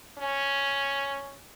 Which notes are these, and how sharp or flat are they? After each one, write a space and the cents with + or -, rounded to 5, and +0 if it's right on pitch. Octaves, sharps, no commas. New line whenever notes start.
C#4 +0